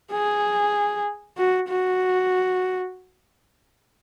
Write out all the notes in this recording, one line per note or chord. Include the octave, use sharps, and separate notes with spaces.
G#4
F#4
F#4